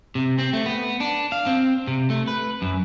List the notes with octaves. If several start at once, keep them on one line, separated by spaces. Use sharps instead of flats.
C3
C4
A3
B3
D4
F5
C4
C3
A3
B4
F#2